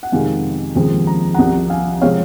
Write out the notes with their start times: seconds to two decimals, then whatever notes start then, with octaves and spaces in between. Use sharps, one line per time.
0.03 F#5
0.12 F2 C3 D#3 G#3 F5 G#5
0.75 D#2 C#3 F3 G#3 C4
1.07 A#5
1.34 C2 C3 F3 F#5 A#5
1.70 F5 G#5
2.01 C3 F3 G#3 C4 C#5 F5